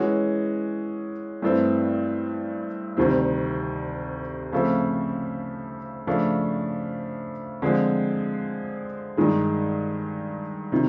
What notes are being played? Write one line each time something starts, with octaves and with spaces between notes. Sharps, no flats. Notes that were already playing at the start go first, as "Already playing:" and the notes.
Already playing: E3 G#3 C#4 F#4
G2 E3 A3 C4
D2 C3 D#3 G3 C4
C#3 F3 A3 C4
C#3 F3 A3 D4
D3 F3 G#3 C4
G2 D#3 G#3
C3 D#3